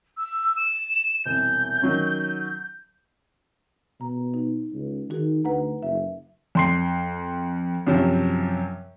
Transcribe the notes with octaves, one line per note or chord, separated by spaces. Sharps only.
E6
E7
E1 C2 G6
D#3 F#3 C#4
B2 A#5
D#4
C#2
D#3 D#4 F#4 G#4
D2 B4 F#5 A#5
F#1 E5
F2 C6 C7
F#2 C3 F3 F#3